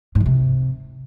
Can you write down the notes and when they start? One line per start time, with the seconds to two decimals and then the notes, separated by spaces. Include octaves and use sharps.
0.15 G#2
0.20 D#3
0.26 C3